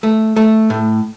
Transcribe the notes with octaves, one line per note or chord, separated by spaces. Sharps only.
A3
A3
A2